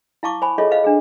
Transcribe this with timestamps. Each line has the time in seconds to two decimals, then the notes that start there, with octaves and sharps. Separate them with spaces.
0.23 E4 F5 A5 C#6 D6
0.42 C5 G#5 B5
0.58 F4 G#4 A4 C#5 D#5 E5
0.71 B4 C5 D#5 F5
0.84 D4 G#4